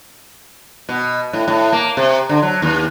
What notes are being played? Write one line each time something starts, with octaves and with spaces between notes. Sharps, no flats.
B2
A2
A2
A#3
C3
D3
F#3
D#2